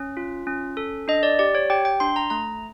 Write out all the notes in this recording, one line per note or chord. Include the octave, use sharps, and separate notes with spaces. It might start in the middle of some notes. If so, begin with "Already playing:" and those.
Already playing: C#4
F4
C#4
A4
D4 D#5
D5
G4 D5
C#5
G4 G5
G5
D4 C6
A#5
A3 A#5